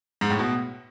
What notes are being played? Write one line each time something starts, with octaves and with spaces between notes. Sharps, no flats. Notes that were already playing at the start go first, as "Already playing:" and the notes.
G#2
A2
B2